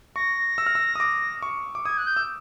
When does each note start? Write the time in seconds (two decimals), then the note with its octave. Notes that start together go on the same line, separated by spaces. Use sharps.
0.15 C#6 A#6
0.58 E6
0.66 F6
0.75 E6
0.96 D#6
1.00 D6
1.42 C#6
1.75 D6
1.85 D#6 G#6
1.97 F#6
2.06 G6
2.17 E6